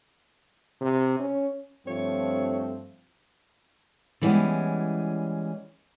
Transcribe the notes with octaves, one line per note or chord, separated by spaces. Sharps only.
C3
C#4
G2 F3 A3 C4 C#5
D3 E3 G3 G#3 B3 C#4